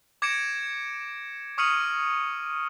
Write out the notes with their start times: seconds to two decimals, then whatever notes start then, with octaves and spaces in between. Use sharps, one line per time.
0.22 D6 G#6 A#6 C#7 D7 E7
1.58 C#6 D#6 F6 C#7 D#7 F#7